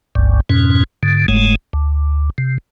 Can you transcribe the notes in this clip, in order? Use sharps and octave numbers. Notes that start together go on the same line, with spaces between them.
G1 C#2 G2
F2 G#2 B2 C#4
G#2 D3
F#1 G#2 G#3 A3
D2
C3